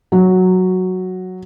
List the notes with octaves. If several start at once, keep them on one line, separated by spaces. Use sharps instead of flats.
F#3